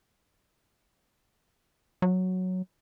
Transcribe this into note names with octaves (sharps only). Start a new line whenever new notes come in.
F#3